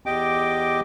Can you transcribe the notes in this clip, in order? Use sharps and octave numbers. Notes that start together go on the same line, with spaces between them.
E2 G4 D#5 G5 D6